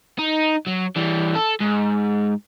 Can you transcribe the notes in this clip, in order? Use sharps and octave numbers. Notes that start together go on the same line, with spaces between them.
D#4
F#3
E3 G3
A4
G#2